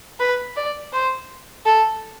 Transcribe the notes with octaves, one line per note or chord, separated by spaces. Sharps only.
B4
D5
C5
A4